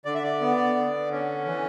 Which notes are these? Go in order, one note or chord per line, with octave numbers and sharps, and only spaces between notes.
D3 D5
E5
D5
B3
D3
C#4
E3